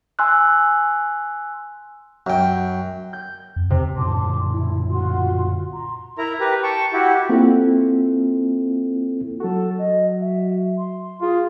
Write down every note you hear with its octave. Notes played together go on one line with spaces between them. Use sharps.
G#5 C6 E6 F#6
F#2 G5
G6
F2
E2 C3
F#2 A#2 D3 A5 C6 D6
E4
F4 F#4 C6
A#5 C6
E4 A#4 A#5
G4 A#4 B4
G5 A5 C#6
E4 F#4 G4
A#3 C4 E4 F4 A4
F#3 F#4 A4
D#5
E5
C6
F4 G#4